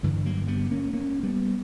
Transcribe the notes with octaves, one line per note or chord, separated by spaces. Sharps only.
G2 D3 E3 G3
F#3 A#3
G3 B3
A#3 C#4
A#3 C#4
G3 B3